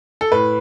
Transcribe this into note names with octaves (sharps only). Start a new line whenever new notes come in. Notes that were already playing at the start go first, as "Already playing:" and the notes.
A4
A2 B4